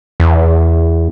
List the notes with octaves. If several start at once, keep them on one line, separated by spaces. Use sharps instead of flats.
E2